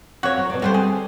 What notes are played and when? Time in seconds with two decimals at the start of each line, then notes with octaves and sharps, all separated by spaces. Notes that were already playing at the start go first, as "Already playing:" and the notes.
0.23 F2 C3 C4 F#4 C#5
0.37 F#3 A#4
0.50 B2 D5
0.62 D3 G3 B3 C4 F4 C5
0.74 G#4